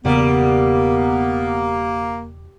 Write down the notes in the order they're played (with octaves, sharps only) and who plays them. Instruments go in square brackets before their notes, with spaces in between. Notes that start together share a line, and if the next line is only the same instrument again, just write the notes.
[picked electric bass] E1 C#3 [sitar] G3 [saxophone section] A#3 [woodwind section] B3